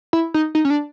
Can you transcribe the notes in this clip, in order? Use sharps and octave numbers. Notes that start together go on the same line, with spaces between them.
E4
D#4
D#4
C#4
D4